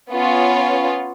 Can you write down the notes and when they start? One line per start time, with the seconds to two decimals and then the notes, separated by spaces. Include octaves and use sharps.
0.11 B3 C#4 F4 C#5